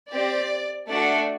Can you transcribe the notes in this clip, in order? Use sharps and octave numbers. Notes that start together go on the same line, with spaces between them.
C4 G4 D5
A3 D4 F#4 A4 D5